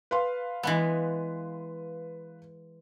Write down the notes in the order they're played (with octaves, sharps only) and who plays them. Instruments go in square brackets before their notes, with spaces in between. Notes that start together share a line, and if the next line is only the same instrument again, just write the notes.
[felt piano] B4 F5 C6
[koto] E3 G#3 B3